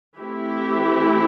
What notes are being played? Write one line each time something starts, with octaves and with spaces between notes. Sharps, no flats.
E3 A3 C4 E4 G4